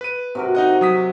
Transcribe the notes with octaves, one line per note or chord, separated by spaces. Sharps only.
B4 D#7
C3 F#4 A#4
D#4 D#5 F#5
F#3 D#6 B6